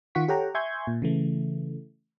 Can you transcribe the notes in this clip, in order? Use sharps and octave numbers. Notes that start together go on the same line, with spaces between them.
D#3 F4 F#5 C#6 B6
G4 A4 C#5 F#5 G5 A#5
E5 G#5 C6 C#6 G6 G#6
A#2
C#3 E3 A3